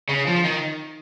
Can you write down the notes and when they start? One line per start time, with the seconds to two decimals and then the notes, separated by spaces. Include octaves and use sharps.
0.09 C#3
0.27 F3
0.45 D#3